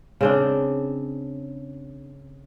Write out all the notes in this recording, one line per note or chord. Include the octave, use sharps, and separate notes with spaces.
C#3 C4 D4